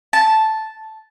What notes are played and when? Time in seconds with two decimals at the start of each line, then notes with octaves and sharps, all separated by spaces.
0.13 A5